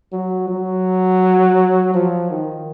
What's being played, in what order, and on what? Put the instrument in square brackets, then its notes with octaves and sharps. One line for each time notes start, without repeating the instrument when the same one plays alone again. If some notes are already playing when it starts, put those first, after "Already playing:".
[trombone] F#3
F#3
F3
D#3